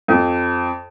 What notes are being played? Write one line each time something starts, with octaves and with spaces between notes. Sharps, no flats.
F2